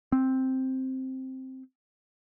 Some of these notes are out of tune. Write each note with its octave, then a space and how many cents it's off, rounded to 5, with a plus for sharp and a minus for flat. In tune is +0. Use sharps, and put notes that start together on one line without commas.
C4 +0